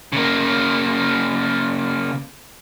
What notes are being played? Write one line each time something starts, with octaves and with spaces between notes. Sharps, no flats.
C#3 A#3